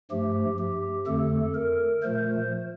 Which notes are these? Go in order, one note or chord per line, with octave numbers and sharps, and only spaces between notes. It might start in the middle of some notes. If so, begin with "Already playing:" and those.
G2 F3 A3 G4
G4
F2 D3 A3 A4
A#4
A#2 F3 A3 C5